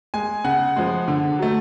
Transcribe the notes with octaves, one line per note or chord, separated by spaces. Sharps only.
G#3 G#5
C#3 F#5
F3 G#3
D3
F#3 A3